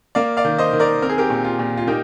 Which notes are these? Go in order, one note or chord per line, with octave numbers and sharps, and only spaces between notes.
A#3 D5 F5
D5 F5
D#3
C5 D#5
D#3
A#4 D5
C4 A#4
G#4
G4 A#4
A#2
F4
A#2
F4
A#3 D#4 G4